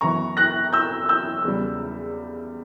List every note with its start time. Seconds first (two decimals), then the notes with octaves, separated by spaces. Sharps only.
0.01 F#2 E3 B3 A#5 C#6
0.37 F#6 A#6
0.73 E6 G6
1.09 E6 G6
1.44 E2 C#3 G3